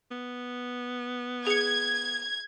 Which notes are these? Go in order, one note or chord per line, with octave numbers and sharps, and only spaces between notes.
B3
G#4 G#6 C#7